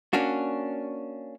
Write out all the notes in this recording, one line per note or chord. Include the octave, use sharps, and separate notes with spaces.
A#3 C#4 D4 F#4